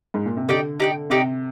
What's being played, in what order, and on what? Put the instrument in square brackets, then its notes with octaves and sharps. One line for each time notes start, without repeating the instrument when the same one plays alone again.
[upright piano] G#2
A#2
C3
[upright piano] D3 [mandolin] D#4 G4 D5 G5
[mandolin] D#4 G4 D5 G5
[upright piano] C3 [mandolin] D#4 G4 D5 G5